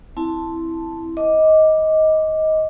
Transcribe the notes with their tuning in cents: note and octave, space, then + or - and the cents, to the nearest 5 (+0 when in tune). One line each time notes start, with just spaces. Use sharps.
C4 +0 E4 +0 A5 +0
D#5 +15 D6 +0